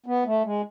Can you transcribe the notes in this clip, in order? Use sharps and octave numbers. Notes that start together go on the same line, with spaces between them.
B3
A3
G#3